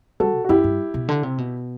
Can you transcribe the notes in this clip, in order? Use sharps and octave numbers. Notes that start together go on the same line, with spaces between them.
G3 F#4 A4
B2
F#4
F#2 E4 G4
G2
B2
D3
C3
B2